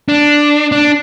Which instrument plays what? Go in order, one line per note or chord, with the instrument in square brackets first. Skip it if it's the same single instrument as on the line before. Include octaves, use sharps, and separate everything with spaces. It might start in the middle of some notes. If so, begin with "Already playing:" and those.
[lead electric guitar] D4
D4